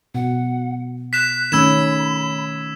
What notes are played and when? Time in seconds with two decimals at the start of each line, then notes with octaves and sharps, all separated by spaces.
0.15 B2 F#5
1.13 F#6 B6 E7
1.52 D#3 A3 C#4 B5 E6 G#6 E7